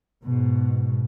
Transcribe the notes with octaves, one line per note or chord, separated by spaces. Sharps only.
G#2 B2